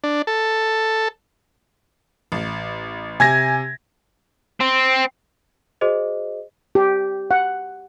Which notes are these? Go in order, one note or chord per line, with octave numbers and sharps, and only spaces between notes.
D4
A4
A1
C3 G#5 G#6 A#6
C4
F#4 G#4 C5 D#5
G4
F#5